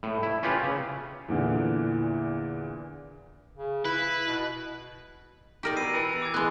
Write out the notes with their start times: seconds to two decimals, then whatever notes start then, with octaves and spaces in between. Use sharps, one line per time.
0.03 A2
0.23 E4
0.43 C#4 F4 G4 B4
0.63 C#3
1.28 E2 A#2 D3 E3
3.57 C#3
3.85 E4 B4
4.28 B2
5.63 D#4 G4 A#4 D5
5.76 B2 E6 C7 D#7
5.93 E3
6.22 D6 E6 G#6
6.34 G#3 B3 F#6